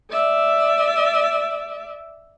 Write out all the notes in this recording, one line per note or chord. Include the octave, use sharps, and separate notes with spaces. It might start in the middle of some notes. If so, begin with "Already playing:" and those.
D5 E5